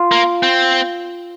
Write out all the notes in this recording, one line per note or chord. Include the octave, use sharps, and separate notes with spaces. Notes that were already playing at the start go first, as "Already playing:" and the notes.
Already playing: F4
A#3
C4